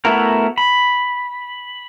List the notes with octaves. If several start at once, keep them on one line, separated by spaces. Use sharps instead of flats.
A3 B3 E4 F#4 A#4
B5